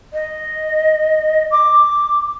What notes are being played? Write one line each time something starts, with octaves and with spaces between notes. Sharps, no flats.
D#5
D6